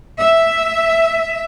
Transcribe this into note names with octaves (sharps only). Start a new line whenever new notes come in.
E5